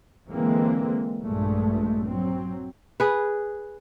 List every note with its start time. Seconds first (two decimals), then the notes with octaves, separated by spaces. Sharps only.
0.30 D3 E3 G#3 A#3 C4
1.24 A#1 G2 G#3 A3
2.06 F#3 C4
3.00 G#4 B4